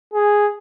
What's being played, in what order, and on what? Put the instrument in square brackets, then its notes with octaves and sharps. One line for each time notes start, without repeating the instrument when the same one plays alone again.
[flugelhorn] G#4